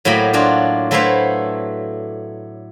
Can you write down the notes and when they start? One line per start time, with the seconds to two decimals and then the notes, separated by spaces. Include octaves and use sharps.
0.05 A2 F#3 A#3 G5 B5
0.33 F#3 D4 F4 F#4
0.91 F#3 A3 E4 B4 C5 F5